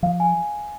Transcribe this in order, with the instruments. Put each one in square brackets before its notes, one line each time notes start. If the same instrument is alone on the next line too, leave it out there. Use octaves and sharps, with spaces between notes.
[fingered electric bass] F3 [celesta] F5
[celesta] G#5